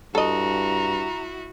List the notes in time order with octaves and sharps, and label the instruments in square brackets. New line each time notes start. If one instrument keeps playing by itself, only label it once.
[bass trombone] G2 [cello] E4 F#4 [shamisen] A4 D#5 [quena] A#5